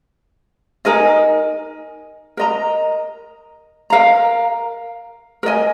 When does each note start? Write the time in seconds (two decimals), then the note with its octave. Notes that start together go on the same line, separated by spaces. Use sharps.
0.85 D#4 A#4 D#5 G#5
2.37 A#4 D#5 A#5
3.90 A#4 F5 A#5
5.43 A#4 D#5 G#5